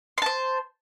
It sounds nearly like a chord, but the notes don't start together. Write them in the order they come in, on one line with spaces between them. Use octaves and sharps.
C6 A5 C5